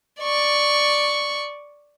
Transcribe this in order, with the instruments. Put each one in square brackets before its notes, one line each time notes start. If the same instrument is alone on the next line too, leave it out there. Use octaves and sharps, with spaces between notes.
[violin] D5 C#6